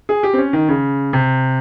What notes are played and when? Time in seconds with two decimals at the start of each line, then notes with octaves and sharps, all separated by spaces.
0.09 G#4
0.23 G4
0.33 C4
0.38 C#4
0.53 D#3
0.68 C#3
1.13 C3